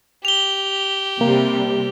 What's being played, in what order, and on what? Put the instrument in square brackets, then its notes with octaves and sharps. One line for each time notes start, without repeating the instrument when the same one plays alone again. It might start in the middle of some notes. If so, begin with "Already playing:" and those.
[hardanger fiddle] G4 [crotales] F7 G7
[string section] C3 G3 [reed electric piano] A#3